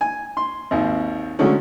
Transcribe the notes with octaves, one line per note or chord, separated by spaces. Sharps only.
G#5
C6
G#1 D#2
D3 F#3 G#3 A3 C#4